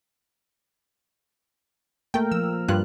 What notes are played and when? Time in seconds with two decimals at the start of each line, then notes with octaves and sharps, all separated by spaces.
2.14 A3 A#3 A#4 G5
2.32 F3 E6
2.68 G2 F4 F#6